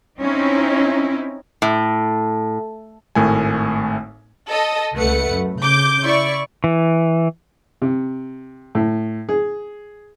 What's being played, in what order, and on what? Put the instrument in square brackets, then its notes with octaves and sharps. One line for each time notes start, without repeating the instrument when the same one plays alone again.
[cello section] C4 C#4 D#4 E4
[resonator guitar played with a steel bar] A2
[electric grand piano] G#1 A2 A3 A#4 G#5
[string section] A4 D#5
C#2 A3 B4 F#5 C#7
F#2
C#3 D6 G6
E4 D5 C#6
[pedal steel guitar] E3
[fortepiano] C3
A2
G#4